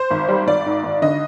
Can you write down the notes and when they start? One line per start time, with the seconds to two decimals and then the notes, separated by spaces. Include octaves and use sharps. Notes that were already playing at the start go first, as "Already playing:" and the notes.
Already playing: C5
0.11 G#1
0.28 G3
0.47 G#1 D5
0.66 G#2
0.83 G#1
1.02 D3 D#5